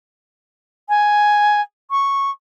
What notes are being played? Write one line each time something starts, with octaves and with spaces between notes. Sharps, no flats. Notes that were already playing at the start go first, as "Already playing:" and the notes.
G#5
C#6